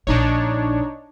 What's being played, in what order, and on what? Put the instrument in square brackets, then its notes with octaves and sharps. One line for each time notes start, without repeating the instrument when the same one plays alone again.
[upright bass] A#1 A#2 [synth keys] D4 D#4 C#5